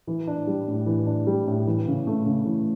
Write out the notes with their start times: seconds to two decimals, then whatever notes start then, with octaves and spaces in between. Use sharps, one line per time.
0.07 E3
0.27 D4
0.47 G3
0.68 A2
0.86 E3
1.06 D4
1.27 G3
1.47 A2
1.67 E3
1.87 C#3
2.07 A3
2.26 C#3
2.45 E3